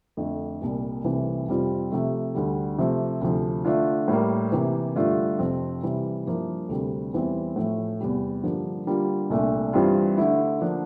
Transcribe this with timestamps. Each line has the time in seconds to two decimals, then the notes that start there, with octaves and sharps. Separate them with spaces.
0.17 F2 D3 A3
0.61 C2 A#2 G3 A#3
1.04 C2 C3 E3 A3 C4
1.48 F2 C3 G3 C4 F4
1.92 C3 F3 A3
2.35 D2 D3 G3
2.78 C3 F3 A3 C4
3.21 D2 C3 F3
3.65 D3 A3 D4 F4
4.08 A2 G3 A#3
4.52 C3 E3 A#3
4.95 G2 D3 A3 D4 F4
5.39 F2 C3 F3 C4
5.83 C3 E3 G3
6.26 G2 F3 A#3 E4
6.69 D2 C3 G3 C4
7.13 E2 E3 G3 C4
7.56 A2 F3 A3
8.00 E2 C3 G3
8.43 G2 D3 F3 A#3
8.86 D3 G3 A#3 F4
9.30 C2 A#2 A3 D4
9.73 G2 E3 G3 C4 F4
10.17 D3 A3 E4
10.61 D3 F3 A#3 D4